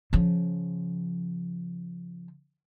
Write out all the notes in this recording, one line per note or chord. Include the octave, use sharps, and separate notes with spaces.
C#3 F3